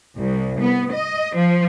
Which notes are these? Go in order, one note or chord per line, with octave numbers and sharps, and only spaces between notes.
C2
B3
D#5
F3